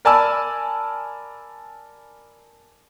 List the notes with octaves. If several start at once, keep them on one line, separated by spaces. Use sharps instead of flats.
A#4 D5 G#5 A5 B5 E6